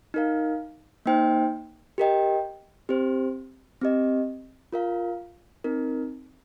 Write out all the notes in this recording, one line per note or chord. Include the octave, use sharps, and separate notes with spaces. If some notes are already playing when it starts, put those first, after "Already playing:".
D#4 A#4 F5
A#3 D#4 C5 G5
G4 A#4 D#5 G5
C4 G4 C5
C4 G4 D#5
F4 A#4 F5
C4 D#4 A#4